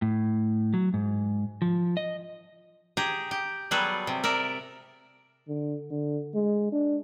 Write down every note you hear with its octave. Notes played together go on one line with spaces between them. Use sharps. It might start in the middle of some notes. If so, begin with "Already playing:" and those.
A2
F#3
G#2
F3
D#5
G4 G#4 A#5
G4
F#3 G3 B3 G#4 A4 B4
C3
A#4 D5 E5
D3
D3
G#3
D4